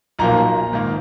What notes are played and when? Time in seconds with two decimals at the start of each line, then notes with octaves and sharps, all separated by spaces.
0.19 B1 A#2 F3 A#3 A#5
0.73 G#2 D#3 A#3